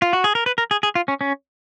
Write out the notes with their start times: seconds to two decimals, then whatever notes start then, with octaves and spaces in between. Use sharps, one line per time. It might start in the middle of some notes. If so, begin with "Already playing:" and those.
0.02 F4
0.13 F#4
0.24 G#4
0.35 A#4
0.46 B4
0.58 A#4
0.71 G#4
0.83 G#4
0.95 F4
1.08 C#4
1.21 C#4